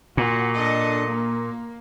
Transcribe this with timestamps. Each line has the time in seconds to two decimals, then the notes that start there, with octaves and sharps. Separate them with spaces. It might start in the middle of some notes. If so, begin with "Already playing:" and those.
0.17 A#2 F#4
0.56 D4 A4 D#5
1.07 A#3